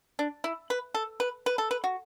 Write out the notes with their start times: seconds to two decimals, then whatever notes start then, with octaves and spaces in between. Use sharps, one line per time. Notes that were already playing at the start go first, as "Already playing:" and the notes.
0.19 D4
0.44 E4
0.70 B4
0.94 A4
1.20 B4
1.46 B4
1.58 A4
1.71 B4
1.84 F#4